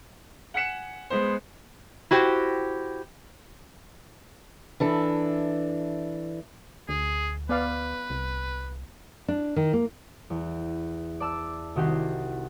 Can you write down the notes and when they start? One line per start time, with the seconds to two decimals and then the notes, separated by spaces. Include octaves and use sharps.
0.54 F#5 G#5 F#6 B6 C#7 E7
1.10 G#3 B3 C5
2.11 E4 F#4 G4 C5
4.80 E3 D4 A4
6.89 D2 G#4
7.49 B3 B4 D5 F5
8.10 C2
9.28 D4
9.56 D#3
9.73 A#3
10.30 E2
11.20 D5 A5 E6
11.76 C2 D#3 F#4 G4 C7